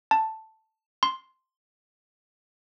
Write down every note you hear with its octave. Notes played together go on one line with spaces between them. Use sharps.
A5
C6